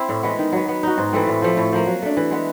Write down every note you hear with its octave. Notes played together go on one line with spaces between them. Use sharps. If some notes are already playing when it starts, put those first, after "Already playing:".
Already playing: C4 E4
A2
E3 G#3 B3
D#3
F#3 B3
B3
D#4 F#4
G#2
E3 A3 C4
A2
F3 A3
A2
F3 A#3
F#3
A3 D4
E3
G#3 B3